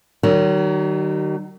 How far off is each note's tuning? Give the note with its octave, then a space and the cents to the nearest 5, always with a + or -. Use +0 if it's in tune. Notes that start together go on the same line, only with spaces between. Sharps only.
D#3 -30 F#3 +40